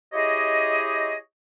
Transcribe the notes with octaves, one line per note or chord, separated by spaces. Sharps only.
E4 G4 G#4 C#5 D#5